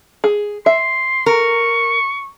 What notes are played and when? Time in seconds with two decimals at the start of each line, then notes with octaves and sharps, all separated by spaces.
0.24 G#4
0.66 E5 C6
1.26 A#4 C#6